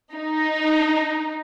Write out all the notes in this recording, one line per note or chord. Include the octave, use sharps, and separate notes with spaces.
D#4